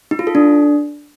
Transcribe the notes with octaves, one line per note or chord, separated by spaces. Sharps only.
D#4
F4
A4
D4